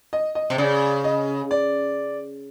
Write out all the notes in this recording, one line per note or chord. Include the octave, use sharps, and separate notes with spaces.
D#5
D#5
C3
C#3 D5
D#5
D5